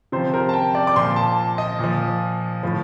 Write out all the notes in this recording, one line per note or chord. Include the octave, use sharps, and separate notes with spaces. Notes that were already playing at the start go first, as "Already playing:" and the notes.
C3 F3 C5
A#4
A5
G5
D5
D6
A#2 F3 C6
A5
D#5
A#2 F3
A2 F3